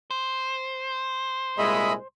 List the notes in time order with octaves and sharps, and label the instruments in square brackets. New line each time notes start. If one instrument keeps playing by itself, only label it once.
[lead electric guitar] C5
[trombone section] C2 A#2 G#3 [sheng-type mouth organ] D#5 E5 B5